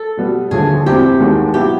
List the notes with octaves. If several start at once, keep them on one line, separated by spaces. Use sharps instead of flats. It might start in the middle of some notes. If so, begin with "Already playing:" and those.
Already playing: A4
B2 G3 B3
D#2 D3 F3 A3 G#4
E2 B2 G3 C4 E4 G4
D#2 D#3 G#3 B3
B2 F#3 B3 E4 G4